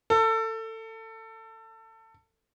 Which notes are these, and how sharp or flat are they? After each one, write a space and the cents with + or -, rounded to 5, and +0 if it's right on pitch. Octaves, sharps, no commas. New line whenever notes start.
A4 +25